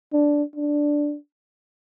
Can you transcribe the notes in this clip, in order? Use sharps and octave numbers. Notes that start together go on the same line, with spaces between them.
D4
D4